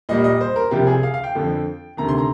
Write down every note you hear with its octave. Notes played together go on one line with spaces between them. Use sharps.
A#2 G3 A#3 D#5
D#5
C5
A#4
C2 C3 F3 G4
G#4
F5
F5
G5
F2 D3 F3
D2 C3 D#3 A#5
C6
A#5